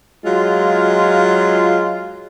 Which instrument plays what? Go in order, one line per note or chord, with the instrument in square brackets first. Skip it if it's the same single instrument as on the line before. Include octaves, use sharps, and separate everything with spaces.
[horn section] F#3 G#3 F4